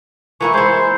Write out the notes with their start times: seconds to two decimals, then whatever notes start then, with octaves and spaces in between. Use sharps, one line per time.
0.41 E3 A#3 E4 C#6
0.54 G#3 E4 C5